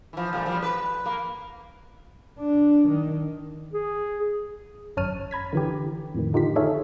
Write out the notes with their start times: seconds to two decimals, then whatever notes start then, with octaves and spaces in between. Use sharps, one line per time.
0.13 E3 F3
0.33 A#2 G3 A3
0.46 F3 G3
0.62 B4
1.06 A#3
2.39 D4
2.89 D#3
3.73 G#4
4.97 G#1 F#2 C#5 A5 F6 D#7
5.31 A#5 B5 G#6 B6
5.53 D3 E3 G4
6.14 F2 A2 D#3
6.33 D3 D#4 F4 G4 B6
6.56 D#4 G#4 A4 C#5 E5 F5